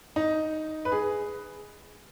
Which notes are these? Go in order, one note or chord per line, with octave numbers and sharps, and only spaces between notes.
D#4
B4
G#4